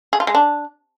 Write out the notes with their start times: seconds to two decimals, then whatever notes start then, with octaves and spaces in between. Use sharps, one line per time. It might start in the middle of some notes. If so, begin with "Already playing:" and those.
0.13 G#4
0.20 F4
0.27 G#3
0.35 D4